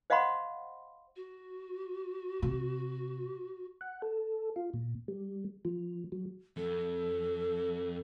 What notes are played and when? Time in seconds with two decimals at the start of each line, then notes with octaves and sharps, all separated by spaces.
0.10 C5 D#5 F5 F#5 B5 C6
1.16 F#4
2.42 C3
3.81 F#5
4.02 A4
4.56 F4
4.74 A#2
5.08 G3
5.65 F3
6.12 F#3
6.57 F2 A4